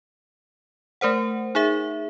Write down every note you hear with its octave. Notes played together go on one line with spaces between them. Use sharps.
A3 A#4 C5 F#5
D#4 G#4 E5